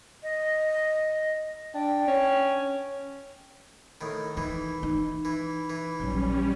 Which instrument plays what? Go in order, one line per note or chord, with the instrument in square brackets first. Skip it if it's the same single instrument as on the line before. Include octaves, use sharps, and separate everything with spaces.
[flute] D#5
[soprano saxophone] D4 [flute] G5
[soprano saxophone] C#4
[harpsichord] A2 D#3
[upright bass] D#3 [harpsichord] E3
[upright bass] D#4
[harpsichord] E3
E3
[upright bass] A#1 F#3 [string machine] G3 C#4